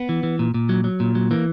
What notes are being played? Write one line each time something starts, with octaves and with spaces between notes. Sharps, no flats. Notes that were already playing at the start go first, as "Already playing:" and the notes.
Already playing: B3
E3
E3
A#2
A#2
F#3
F#3
A#2
F#3
E3 A#3